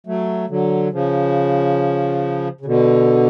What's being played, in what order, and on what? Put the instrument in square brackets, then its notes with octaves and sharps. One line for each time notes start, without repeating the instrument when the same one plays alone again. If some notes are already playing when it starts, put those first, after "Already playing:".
[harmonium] F#3 A3
D3 F#3
C#3 F3
C#3
B2 D3